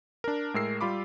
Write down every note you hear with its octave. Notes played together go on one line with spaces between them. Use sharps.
D4 A#4
A2 G#3 A#4 E6 C7
G3 F4 B5 D6